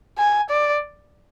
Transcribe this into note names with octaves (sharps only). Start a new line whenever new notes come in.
G#5
D5